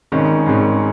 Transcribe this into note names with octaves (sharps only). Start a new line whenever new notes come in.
G#1 G#2 D#3 G#3 C#4
G#1 G#2 D#3 G#3 C#4